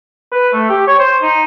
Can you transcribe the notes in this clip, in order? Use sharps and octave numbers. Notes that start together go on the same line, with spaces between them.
B4
A3
G4
C#5
C5
D#4